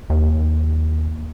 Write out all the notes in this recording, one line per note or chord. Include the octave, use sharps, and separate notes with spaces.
D#2